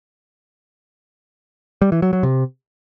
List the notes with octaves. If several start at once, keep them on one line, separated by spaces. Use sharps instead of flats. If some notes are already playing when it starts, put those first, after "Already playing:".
G3
E3
F#3
F#3
C3